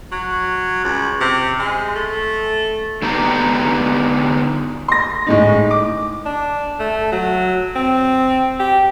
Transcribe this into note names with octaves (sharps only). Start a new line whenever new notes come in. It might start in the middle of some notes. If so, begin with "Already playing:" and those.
F#3
C#2
C3
G#3
A3
D3 B3 D#4 G4 D#5 A#5
C6 A#6
A2 G#3 D#4
D6
D4
A3
F#3
C4
G4